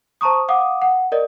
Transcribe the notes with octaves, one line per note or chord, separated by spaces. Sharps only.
C5 A5 A#5 C#6 D#6
F5 F#5 D6 D#6
F#5
A#4 D5 D#5